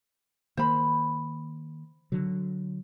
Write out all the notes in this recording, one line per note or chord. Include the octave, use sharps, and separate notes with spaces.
D#3 A#3 C5 B5
D3 F#3